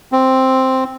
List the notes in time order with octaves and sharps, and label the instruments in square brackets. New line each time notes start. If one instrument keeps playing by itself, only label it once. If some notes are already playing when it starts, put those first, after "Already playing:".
[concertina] C4